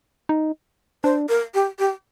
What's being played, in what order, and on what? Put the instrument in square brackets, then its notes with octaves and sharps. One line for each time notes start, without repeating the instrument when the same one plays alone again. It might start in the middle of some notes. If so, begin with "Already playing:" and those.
[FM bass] D#4
[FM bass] D4 [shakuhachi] C5
[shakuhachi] A#4
G4
G4